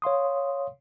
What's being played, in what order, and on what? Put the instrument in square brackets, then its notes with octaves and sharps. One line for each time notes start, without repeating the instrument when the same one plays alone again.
[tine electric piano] C#5 F5 C6 D#6